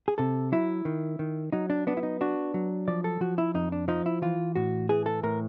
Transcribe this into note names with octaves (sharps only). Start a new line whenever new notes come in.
G#4
C3 A4
F#3 E4
D#3
D#3
F#3 D#4
D4
B3 D4
E4
D#4
D4 F#4
F#3
F3 D5
A4
F3 F#4
E4
F2 D#4
D4
F3 D#4
E4
E3 F4
A2 F#4
E3 G#4
A4
A2 A#4